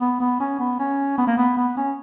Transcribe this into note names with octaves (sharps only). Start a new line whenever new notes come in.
B3
B3
C#4
B3
C#4
B3
A#3
B3
B3
C#4